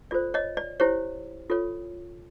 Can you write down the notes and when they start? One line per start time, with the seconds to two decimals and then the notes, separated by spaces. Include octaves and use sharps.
0.11 F4 A4 C5 D5
0.34 C#5 D#5
0.57 D5
0.80 E4 G4 C5 C#5
1.50 F4 A4 C#5